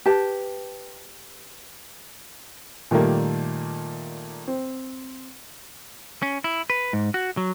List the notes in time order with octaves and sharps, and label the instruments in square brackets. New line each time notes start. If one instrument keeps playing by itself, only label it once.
[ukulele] G4 B4 A5
[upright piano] A#2 D#3 G3 A3 A#3
C4
[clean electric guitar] C#4
E4
B4
G#2
F#4
F#3